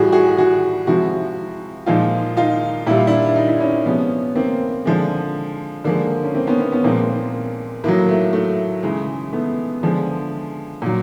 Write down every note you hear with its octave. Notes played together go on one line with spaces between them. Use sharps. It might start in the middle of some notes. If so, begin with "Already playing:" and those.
Already playing: A2 E3 G3 F#4 G#4
F#4 G#4
F#4 G#4
C3 F3 G#3 E4 F#4
A#2 F3 G#3 D#4 F4
D#4 F4
A#2 G3 E4
F4
D4 E4
D#4
E4
C#4 D#4
C3 F3 G#3 B3 C#4
A#3 C4
D3 F3 G#3
D3 F3 G#3 A#3
C#4
A#3 C4
B3 C#4
B3 C#4
B3 C#4
A#2 F3 G#3 A#3 C4
A#3
A2 F#3 A#3
A3
A3
C#3 E3 G#3
A3 B3
D3 F3 G#3
A#2 F#3